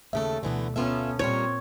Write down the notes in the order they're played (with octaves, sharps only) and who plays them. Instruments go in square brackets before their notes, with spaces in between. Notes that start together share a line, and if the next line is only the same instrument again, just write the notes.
[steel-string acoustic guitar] D#2 C#3 A4 [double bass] A3 [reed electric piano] E5
[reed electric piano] D2 B2 [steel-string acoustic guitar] D3 E3 B3
[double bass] B3 C#4 [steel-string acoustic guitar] F4 A4 E5
[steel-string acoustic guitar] F2 G3 A#4 [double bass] A#2 C4 [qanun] C#5